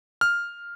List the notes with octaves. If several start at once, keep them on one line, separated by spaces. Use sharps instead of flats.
F6